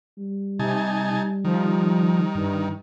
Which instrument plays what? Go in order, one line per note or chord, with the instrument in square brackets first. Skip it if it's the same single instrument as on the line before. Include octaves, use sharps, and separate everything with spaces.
[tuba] G3
[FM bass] C3 [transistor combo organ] D#4 G#5 A5
[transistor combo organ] D#3 [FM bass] F3
[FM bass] G2